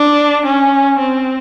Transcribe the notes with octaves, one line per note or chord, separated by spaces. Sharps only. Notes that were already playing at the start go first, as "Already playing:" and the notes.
Already playing: D4
C#4
C4